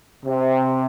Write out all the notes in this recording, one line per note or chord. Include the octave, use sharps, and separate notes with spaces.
C3